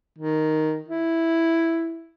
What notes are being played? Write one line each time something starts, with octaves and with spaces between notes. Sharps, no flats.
D#3
E4